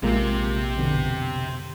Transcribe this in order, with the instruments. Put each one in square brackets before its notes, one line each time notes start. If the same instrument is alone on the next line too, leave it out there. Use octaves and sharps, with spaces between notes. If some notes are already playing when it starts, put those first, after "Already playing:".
[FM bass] A#1 [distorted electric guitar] C3 C4 [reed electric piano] G#3 A#3 F4
[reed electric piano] F2 B2 D3